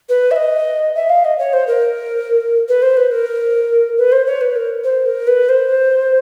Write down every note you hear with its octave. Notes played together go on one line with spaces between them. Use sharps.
B4
E5
D#5
E5
F5
D#5
C#5
C5
A#4
B4
C5
B4
A#4
B4
C5
C#5
B4
A#4
C5
A#4
B4
C5